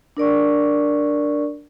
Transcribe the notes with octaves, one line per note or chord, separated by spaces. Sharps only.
D4 A#4 D5 C#6